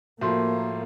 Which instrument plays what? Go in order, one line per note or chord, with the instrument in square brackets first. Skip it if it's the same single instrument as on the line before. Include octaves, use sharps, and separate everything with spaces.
[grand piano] A2 F3 [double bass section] A#3 [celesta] F#4 C6